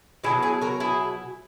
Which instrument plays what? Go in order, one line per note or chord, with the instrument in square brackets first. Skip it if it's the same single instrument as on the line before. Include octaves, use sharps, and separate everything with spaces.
[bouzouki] B2 F#3 E4 G#4
E4 G#4
F#4 A#4
E4 G#4